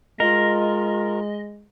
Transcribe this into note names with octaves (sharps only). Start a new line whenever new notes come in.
G#3 F4 A#4 D#5